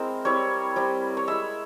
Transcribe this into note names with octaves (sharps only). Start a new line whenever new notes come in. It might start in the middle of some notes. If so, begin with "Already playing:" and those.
Already playing: G#3 C4 E4 A#4 C5
G3 C4 E4 C#5
G3 C4 E4
C#5
G#3 E4 E5